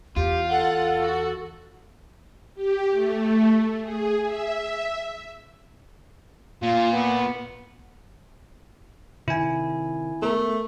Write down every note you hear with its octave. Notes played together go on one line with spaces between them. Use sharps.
E2 F4 G4
A4 F#5
F#4
G4
A3
G#4
E5
A#2 F4
B3
C3 D#3 E4 G#5
A3 B3 A4 A#4